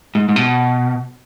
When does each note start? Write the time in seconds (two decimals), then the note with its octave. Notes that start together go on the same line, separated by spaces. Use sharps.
0.15 G#2
0.29 G#2
0.36 B2